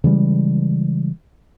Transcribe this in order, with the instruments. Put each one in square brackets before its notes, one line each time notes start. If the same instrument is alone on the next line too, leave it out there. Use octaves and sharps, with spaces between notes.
[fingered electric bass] C#3 E3 G3 G#3